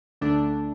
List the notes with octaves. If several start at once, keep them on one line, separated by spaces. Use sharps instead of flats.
D2 D3 A3 D4